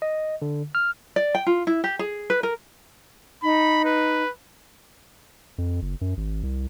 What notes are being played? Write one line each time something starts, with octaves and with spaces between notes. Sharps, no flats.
D#5
D3
F6
D5
G5
F4
E4
G4
G#4
B4
A#4
D#4 B5
B4
F2
F#1
F#2
G#1
C2